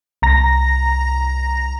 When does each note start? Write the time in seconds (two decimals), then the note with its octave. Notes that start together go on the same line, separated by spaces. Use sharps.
0.22 C2 A#5 A#6